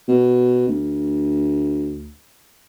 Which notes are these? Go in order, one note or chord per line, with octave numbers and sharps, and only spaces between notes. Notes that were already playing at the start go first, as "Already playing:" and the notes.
B2
D2